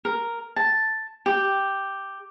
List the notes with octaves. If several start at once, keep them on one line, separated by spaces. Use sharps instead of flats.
A#4
A5
G4